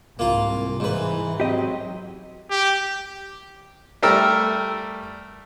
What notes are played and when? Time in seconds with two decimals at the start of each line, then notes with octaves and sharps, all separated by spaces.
0.19 C2 G#2 A#3 F4
0.80 G#2 E3 B4
1.40 F#3 C4 G4 D#5
2.50 G4
4.03 G3 A3 A#4 E6 F6